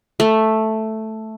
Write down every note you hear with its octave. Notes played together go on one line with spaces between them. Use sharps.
A3